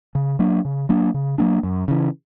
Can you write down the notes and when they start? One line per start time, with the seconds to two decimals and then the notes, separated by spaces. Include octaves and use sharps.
0.15 C#3
0.39 F#3 A#3 D4
0.65 C#3
0.89 F#3 A#3 D4
1.14 C#3
1.38 F#3 A#3 D4
1.63 F#2
1.88 C#3 E3